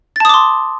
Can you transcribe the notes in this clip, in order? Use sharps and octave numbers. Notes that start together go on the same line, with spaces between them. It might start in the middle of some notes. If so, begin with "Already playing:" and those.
A5 C6 D6 D#6 A6